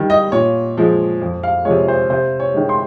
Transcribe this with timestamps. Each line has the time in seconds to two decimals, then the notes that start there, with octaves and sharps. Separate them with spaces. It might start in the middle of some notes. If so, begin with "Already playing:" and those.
Already playing: D#3 G3
0.10 D#5
0.32 A#2 C#5
0.77 F3 G#3
1.22 F2
1.43 F5
1.65 C3 F3 G#3 C#5
1.88 C5
2.10 C3 C5
2.40 C#5
2.54 D#3 G#3
2.69 C6